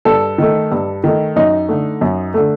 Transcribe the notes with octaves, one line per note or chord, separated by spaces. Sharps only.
G2 A4
D#3 A3
G2
D#3 A3
F#2 D#4
D3 A3
F#2
D3 A3